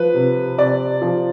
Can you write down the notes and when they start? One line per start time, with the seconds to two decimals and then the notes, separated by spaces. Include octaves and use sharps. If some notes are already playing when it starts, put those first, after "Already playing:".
Already playing: F3 B4
0.14 C3
0.58 C3 D5
1.02 F3